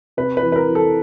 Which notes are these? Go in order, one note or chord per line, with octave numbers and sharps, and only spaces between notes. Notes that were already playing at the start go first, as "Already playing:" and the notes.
C3 B4
B4
E3
B4
A#4
E3
A4